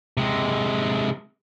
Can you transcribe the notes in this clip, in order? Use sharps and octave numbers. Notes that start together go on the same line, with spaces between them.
C3 G#3